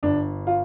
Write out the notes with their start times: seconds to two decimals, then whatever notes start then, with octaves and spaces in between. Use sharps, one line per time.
0.03 G1 D4
0.47 F4